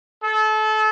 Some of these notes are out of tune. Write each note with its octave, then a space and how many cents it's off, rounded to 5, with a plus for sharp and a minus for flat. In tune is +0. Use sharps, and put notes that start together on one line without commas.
A4 -30